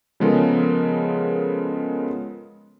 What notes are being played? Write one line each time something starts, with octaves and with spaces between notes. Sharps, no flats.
C#3 F3 G#3 B3 A4 A#4